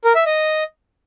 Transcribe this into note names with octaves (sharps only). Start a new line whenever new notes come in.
A#4
E5
D#5